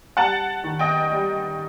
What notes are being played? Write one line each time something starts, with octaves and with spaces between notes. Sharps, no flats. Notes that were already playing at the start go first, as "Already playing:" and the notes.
G3 F#5 A5
D#3
D#5 G5
G3